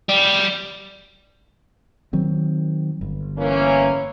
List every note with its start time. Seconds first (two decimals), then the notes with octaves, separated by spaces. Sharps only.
0.09 G3
2.13 D#3 F#3 C4
3.01 G1
3.38 E3 A#3 C#4